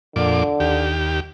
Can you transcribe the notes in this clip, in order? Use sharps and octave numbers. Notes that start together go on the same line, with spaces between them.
F2 A#2 D3 D6
D#2 G4